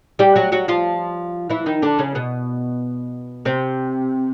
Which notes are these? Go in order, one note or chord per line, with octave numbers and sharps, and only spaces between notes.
G3 G4
F#3 F#4
F#3 F#4
F3 F4
E3 E4
D#3 D#4
D3 D4
C#3 C#4
B2 B3
C3 C4